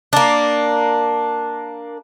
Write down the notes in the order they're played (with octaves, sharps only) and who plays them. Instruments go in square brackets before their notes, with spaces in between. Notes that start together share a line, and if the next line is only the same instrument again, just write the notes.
[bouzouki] A#3 D4